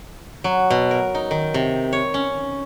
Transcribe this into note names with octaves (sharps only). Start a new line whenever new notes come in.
F#3
B2
A#4
D#4
D#3
C3
C#5
C#4